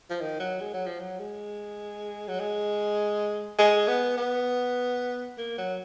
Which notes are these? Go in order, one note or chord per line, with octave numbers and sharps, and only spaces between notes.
F3
D#3
F#3
G#3
F#3
F3
F#3
G#3
F#3
G#3
G#3
B3
B3
A#3
F#3